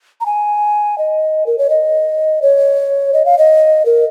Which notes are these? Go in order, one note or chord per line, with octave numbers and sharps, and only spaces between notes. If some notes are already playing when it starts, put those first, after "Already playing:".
A#5
G#5
D#5
A#4
C#5
D#5
C#5
D#5
F5
D#5
A#4